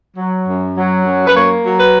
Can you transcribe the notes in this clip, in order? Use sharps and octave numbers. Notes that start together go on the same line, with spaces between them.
F#3
F#2
F#3
F#2
B4
A#3 C#5
F#3
B4